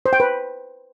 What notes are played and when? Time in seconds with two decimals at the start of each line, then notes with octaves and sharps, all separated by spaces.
0.06 C5
0.13 G5
0.20 B4